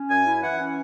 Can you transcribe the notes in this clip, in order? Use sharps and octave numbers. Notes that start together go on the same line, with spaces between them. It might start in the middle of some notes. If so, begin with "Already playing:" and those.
Already playing: C#4
F#2 G#5
E4
E3 F#5
C#4